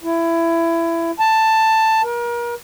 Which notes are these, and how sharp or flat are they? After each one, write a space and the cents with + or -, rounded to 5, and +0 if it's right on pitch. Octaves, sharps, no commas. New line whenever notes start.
E4 +20
A5 +10
A#4 +35